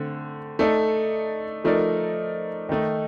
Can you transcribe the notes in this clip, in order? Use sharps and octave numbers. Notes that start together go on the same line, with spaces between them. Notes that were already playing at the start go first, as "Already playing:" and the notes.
Already playing: D3 A3 C4
A3 D#4 A4 D5
F3 A3 D#4 A#4 D5
D#3 A3 D#4